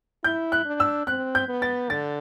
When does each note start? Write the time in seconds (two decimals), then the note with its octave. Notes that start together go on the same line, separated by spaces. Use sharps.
0.24 E4 G6
0.52 F#6
0.65 D4
0.80 E6
1.07 C4 F#6
1.35 G6
1.48 B3
1.62 A6
1.90 D3 A6